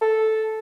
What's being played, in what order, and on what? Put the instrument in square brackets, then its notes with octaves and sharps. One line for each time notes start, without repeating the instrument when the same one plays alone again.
[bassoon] A4